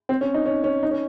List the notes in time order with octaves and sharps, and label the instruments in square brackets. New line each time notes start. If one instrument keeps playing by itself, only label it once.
[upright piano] C4
C#4
D#4
C#4
C#4
D#4
C#4